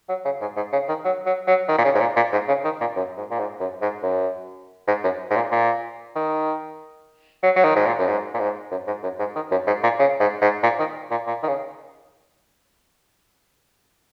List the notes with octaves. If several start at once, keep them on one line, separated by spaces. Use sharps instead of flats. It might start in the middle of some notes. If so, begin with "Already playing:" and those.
F#3
C#3
G#2
G#2
C#3
D#3
F#3
F#3
F#3
D#3
A#2
C#3
G#2
A#2
A#2
G#2
C#3
D#3
A#2
F#2
G#2
A#2
G#2
F#2
G#2
F#2
G#2
F#2
G#2
A#2
A#2
D#3
F#3
F#3
D#3
G#2
A#2
F#2
G#2
A#2
G#2
F#2
G#2
F#2
G#2
D#3
F#2
G#2
A#2
C#3
G#2
G#2
A#2
D#3
A#2
A#2
D#3
C#3